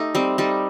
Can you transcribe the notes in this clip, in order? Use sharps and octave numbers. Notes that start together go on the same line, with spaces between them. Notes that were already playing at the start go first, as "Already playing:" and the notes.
Already playing: A3 D#4 G4
G3 C4
G3 D#4